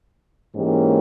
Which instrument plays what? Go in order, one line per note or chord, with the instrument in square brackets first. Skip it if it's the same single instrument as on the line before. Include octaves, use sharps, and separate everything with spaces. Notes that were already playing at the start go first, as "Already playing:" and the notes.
[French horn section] G#2 E3 A#3 C#4 G4